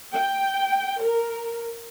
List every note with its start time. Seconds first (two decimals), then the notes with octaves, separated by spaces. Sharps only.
0.14 G5
1.01 A#4